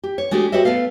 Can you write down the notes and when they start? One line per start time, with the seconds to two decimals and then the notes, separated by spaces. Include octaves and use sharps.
0.04 G4
0.18 C#5
0.31 G#3 A3 D4 F#4 G4
0.52 F#4 G4 B4 C#5 D#5 E5
0.65 A3 B3 A4 F5